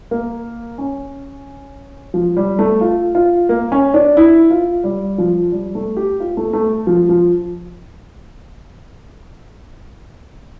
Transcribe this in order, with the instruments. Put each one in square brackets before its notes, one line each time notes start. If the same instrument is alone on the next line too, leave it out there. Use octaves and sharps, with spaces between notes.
[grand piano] A#3
C#4
F3
G3
A3
F4
F4
A#3
C#4
D4
E4
F4
G3
F3
G3
A3
G4
F4
A3
A3
F3
F3